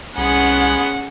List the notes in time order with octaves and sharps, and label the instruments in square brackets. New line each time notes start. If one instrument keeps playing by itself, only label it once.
[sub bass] C2 [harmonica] G#3 B3 [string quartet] C#4 G#4 [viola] F#5